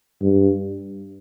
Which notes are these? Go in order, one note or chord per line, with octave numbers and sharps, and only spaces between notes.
G2